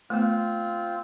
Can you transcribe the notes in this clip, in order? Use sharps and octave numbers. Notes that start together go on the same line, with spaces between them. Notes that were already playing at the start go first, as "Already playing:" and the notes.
A3 B3 C4 F4